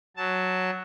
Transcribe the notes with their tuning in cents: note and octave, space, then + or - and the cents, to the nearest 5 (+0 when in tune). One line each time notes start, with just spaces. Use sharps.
F#3 +0 A5 +0